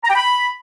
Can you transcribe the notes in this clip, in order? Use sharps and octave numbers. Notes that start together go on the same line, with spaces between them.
A#5
G5
B5